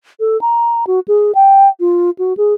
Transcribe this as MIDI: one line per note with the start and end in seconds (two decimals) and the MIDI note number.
0.20 0.39 69
0.41 0.85 82
0.87 1.00 66
1.08 1.32 68
1.35 1.69 79
1.80 2.10 65
2.19 2.33 66
2.37 2.54 68